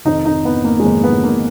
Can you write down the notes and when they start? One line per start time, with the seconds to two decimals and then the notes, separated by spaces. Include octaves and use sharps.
0.05 F1 F2 D#3 D#4
0.26 D#4
0.45 B3
0.64 A#3
0.80 G#3
0.84 F1 F2 D#3 A#3
1.04 B3
1.24 A#3